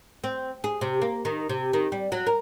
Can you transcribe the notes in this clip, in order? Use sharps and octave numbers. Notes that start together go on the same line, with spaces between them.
C4
G#4
C3
A#3
D#3
C3
D#3
G3
F#3
A#4